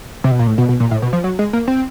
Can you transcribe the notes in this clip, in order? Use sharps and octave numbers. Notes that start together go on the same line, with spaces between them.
C3
B2
A#2
A2
B2
B2
A#2
A2
B2
F3
F#3
G#3
A#3
C4